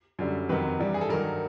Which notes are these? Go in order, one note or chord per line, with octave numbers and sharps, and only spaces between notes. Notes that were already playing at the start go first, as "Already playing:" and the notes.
F#2 D3 G3
F2 C3 D#3 F#3 B4
G2 E3 G3
G#4
A4
G2 D#3 F#3 A#4